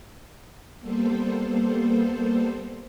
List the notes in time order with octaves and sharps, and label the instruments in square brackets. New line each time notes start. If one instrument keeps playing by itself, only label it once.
[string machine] G3 A#3 B3 A4 C5